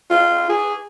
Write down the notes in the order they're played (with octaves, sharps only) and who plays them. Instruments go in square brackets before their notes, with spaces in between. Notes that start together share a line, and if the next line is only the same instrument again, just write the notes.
[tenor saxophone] F4
G#4